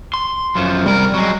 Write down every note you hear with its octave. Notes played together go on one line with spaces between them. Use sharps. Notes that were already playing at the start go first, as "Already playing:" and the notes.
C6
F#2 F3
C3 G3 A#4
F#3 G#3